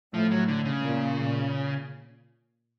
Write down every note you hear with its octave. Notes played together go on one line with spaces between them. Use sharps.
A2 F3
F#3
D3
C#3
A#2